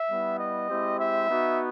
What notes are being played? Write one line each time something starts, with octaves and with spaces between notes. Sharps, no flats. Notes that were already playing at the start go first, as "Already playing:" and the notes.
Already playing: E5
G3 B3 E4
D#5
G#3 C4 E4 G4
E5
B3 D#4 F#4